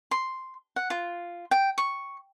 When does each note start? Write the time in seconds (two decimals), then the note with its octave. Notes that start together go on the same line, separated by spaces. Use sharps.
0.11 C6
0.76 F#5
0.90 F4
1.51 G5
1.78 C#6